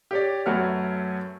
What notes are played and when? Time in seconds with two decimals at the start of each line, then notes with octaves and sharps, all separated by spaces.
0.11 G4 C#5 D5
0.46 F#2 A3 F#4 B4 C#5 F6